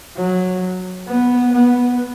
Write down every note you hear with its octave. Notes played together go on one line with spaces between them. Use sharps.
F#3
B3
B3